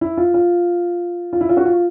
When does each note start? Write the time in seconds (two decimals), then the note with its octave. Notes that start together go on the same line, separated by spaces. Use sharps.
0.01 E4
0.17 F4
0.34 F4
1.33 F4
1.41 E4
1.49 F4
1.57 F#4
1.65 F4